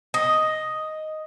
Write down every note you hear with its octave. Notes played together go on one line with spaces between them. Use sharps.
D#5